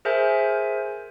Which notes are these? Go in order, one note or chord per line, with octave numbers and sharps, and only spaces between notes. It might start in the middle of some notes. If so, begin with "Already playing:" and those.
G#4 A#4 C5 E5 G#5 G6